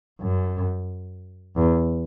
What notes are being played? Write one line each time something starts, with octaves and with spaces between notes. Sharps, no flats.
F#2
E2